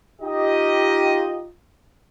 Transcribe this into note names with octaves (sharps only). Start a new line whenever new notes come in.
D#4 F4 G4 D#5